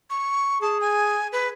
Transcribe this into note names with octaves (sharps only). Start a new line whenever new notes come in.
C#6
G#4 A5
G#5
B4